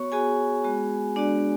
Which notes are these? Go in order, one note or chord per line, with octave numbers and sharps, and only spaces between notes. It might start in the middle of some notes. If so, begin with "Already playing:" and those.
Already playing: B3 F#4 C#5 C#6
B3 F#4 G#4 G#5
G#3 B3 F#4
G#3 B3 D4 F#4 D5